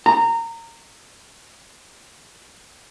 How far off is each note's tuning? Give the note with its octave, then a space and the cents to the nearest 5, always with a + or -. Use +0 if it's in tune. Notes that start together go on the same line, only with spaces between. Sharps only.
A#5 -20